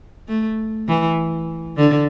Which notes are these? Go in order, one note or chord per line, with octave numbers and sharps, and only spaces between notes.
A3
E3
D3